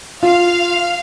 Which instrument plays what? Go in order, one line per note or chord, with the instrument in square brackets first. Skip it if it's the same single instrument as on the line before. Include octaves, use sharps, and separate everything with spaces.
[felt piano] F4 [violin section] F5